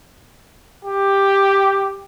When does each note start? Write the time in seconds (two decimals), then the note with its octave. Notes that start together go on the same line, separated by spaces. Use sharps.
0.85 G4